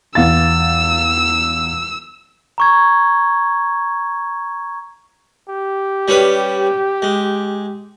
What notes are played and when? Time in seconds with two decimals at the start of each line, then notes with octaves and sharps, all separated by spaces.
0.15 E2 F5 E6 A6
2.58 A#5 C#6 G#6
5.49 G4
6.08 G3 C#4 B4
7.02 G#3